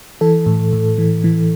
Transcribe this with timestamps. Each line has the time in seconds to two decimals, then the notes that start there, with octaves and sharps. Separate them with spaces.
0.21 E3 A4
0.46 A2
0.73 A2
0.98 E3
1.24 E3